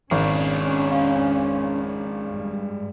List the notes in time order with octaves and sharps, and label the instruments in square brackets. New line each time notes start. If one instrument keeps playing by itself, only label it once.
[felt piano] G#1 [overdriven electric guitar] G#3 D4 [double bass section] C#4
[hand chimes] F5
[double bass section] G2